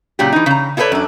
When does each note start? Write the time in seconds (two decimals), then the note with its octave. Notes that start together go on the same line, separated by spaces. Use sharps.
0.19 A#2 C#3 F#3 D4 G4
0.32 E3 D#4
0.46 C#3 A#5
0.77 E4 F4 A4 B4 C#5 D5
0.92 F#2 D4